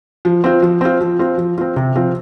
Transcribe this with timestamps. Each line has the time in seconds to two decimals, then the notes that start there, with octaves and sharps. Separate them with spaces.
0.25 F3
0.44 C4 F4
0.62 F3
0.81 C4 F4
1.01 F3
1.19 C4 F4
1.38 F3
1.58 C4 F4
1.76 C3
1.96 F3 C4 F4